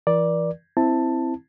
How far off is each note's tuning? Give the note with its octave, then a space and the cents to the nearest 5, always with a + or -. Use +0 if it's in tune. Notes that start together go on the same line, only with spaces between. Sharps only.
E3 +15 A#4 +40 D5 +0
C4 +0 E4 +0 A5 +10